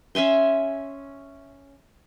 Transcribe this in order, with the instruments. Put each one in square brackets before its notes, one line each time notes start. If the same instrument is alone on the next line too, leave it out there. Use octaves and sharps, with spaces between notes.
[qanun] C#4 E5 G#5 C6